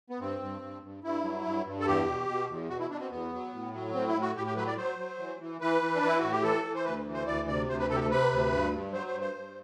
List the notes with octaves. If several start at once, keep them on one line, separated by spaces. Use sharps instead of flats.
B3
G2 C4
G2
G2
G2
G2 E4
F#3
G2
G2
A4
E2 G4
B2
B2
E2
B2 F#4
E4
B2 D4
C4
E2 B3
F#3
A2
F#3
A2 C4
E4
A2
F#4
A2 G4
G4
F#3 B4
D5
F#3 C5
F#3
E3
E3
E3 B4
E3
D4
E3 E4
A2 F#4
G4
E3 A4
E3
C5
D2 B4
E3
C5
D2 D5
C3 D5
D2 C5
B4
C3 A4
G4
A4
C3 B4
D2
G2
G2
F#3 C5
C5
G2
C5
G2